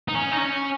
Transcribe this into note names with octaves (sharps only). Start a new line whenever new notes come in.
D#4
C#4
D#4
C#4